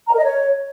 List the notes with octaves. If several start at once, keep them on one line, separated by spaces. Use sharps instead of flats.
A#5
A#4
D#5
C#5